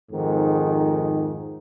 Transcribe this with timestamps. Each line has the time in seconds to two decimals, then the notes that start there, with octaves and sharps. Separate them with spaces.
0.11 F2 G#2 D#3